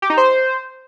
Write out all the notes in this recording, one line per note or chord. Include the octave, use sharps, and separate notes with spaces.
G4
D#4
C5